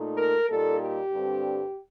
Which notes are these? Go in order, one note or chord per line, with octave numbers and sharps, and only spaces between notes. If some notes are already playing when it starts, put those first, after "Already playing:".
Already playing: A#2 A3 D#4
A#4
A#2 G3 A#3 D#4 A4
G4
G2 D3 G3 C4